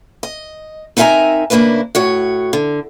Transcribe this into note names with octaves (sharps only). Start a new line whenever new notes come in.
D#5
C4 D#4 A#4 E5 G#5 A#5
C#3 A#3 D4 E4 B4
A2 F#4 C#5
D3